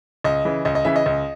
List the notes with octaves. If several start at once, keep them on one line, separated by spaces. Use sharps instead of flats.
C#2 D#5
C#3 E3
C#2 D#5
D#5
C#3 E3 E5
D#5
C#2